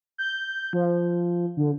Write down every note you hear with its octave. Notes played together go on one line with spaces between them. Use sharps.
G6
F3
D3